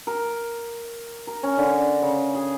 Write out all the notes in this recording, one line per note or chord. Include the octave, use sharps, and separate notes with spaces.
A#4
A#4
C#4
D3
C#3
G#4